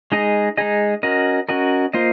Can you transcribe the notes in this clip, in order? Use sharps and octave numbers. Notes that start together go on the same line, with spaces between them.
G#3 D#4 G#4 D#5
G#3 D#4 G#4 D#5
C#4 F#4 A#4 D#5
C#4 F#4 A#4 D#5
A#3 F4 C5 D#5